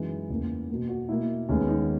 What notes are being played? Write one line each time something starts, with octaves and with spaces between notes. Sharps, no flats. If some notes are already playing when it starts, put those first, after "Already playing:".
Already playing: F#2 E3 G#3 D#4
E2 C#3 E3 A#3
B2 A#3
F#4
B2 A#3 E4
D#2 D#3 G#3 B3 C#4
D#4